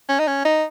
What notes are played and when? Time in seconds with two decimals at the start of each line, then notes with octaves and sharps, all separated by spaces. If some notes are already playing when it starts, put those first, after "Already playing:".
0.09 C#4
0.19 D#4
0.27 C#4
0.45 D#4